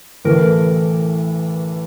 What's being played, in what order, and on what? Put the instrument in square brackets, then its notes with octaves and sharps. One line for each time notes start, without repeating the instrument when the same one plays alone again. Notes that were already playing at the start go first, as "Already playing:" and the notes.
[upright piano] A1 A2 E3 A3 [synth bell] A#4